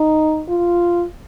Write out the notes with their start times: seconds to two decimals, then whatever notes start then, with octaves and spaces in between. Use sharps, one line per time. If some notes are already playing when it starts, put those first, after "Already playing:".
Already playing: D#4
0.49 F4